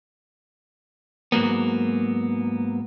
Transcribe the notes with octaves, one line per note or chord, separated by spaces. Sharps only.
G#2 F#3 A#3 B3